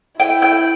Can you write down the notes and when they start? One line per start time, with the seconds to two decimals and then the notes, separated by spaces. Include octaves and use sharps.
0.20 E4 G5
0.42 G5